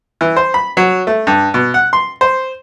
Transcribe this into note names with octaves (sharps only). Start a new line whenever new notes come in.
E3
C5
B5
F#3
A3
G2
B2
F#5
C6
C5